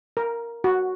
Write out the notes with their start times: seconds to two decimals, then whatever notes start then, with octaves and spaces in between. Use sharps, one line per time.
0.17 A#4
0.64 F#4